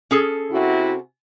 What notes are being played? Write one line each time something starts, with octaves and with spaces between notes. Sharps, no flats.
C#4 G#4 A4
C3 E4 F#4